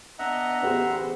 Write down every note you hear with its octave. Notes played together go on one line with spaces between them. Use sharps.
B3 D4 D#5 E5 F#5 A#5
A1 D2 B3 G4 G#4 C5